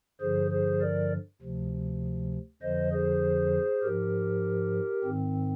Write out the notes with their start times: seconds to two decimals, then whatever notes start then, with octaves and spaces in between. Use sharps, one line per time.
0.21 G2 D3 F3 G#4 C5
0.51 G#4 C5
0.81 A#4 D5
1.42 D2 C3 F3
2.62 F2 D3 F3 C5 D#5
2.92 G#4 C5
3.83 G#2 F3 G4 A#4
5.04 G#2 D#3 C4